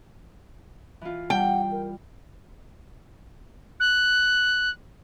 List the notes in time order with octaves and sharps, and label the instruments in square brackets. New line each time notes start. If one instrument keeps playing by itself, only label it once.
[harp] E3 F4
[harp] G3 [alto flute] F#5 [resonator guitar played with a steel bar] G5
[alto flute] A#4
[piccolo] F#6